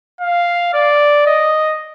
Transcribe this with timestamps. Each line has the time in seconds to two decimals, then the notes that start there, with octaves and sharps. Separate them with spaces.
0.20 F5
0.74 D5
1.27 D#5